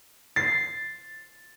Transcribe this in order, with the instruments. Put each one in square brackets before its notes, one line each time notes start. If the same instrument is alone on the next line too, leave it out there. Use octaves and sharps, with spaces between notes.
[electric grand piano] A6 [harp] C7